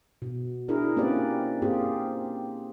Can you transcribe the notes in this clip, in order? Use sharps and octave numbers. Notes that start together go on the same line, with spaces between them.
B2
D4 E4 G#4 A#4
A#3 C4 C#4 G4 B4 D5
A#3 C4 F4 G4 G#4